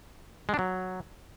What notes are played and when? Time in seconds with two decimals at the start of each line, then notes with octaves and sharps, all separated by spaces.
0.49 G#3
0.54 D4
0.59 F#3